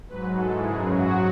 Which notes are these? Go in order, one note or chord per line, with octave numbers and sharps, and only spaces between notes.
G#2 F#3 B4
G#2 E3 G#3 A4
F#2 C#3 F#3 G#4
G#2 F#3 F#4